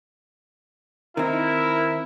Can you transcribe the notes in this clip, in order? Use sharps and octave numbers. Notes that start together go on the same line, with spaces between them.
D#3 C4 E4 A#4